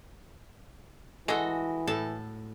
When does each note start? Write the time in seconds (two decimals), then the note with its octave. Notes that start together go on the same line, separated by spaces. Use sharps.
1.28 E3 G#3 F#4 A4 D#5
1.87 A2 A4 A5